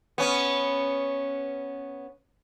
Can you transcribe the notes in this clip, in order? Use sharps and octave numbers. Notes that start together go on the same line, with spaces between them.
B3 C#4